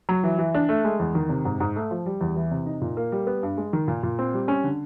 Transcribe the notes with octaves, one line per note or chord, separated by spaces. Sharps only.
F#3
E3
E3
D4
A3
G#3
E2
D#3
C3
G#2
G#2
A3
F3
G3
E2
E3
C3
D#4
A#2
A#3
G3
B3
G2
G#3
D#3
A#2
A#2
C4
G3
C#4
D3